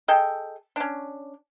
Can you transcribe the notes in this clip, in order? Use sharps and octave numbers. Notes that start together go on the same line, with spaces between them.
G#4 A4 D#5 G5
C#4 D4